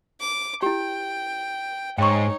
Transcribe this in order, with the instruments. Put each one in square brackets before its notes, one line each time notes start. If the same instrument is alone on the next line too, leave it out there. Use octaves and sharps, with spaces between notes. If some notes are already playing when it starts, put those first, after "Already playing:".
[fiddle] D6
[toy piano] E4 G4 [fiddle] G5
[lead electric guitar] G#2 [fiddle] D#4 C#5 [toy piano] G5 C#6